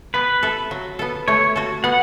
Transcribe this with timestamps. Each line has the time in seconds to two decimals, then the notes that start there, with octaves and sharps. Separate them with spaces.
0.14 B3 B4
0.43 A4 E5
0.71 F#3
0.99 B3 A4
1.28 A3 C#5
1.56 F#4 A4
1.84 B3 F#5